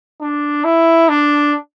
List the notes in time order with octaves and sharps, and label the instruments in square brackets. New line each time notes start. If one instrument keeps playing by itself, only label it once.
[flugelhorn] D4
E4
D4